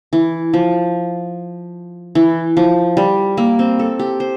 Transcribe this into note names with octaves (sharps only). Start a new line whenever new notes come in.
E3
F3
E3
F3
G3
A#3
C4
A4
G4
C5